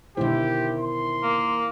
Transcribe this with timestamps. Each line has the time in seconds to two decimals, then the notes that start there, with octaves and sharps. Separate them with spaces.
0.17 B2 D3 D#3 E4 G4 C5
0.79 C6
1.23 A#3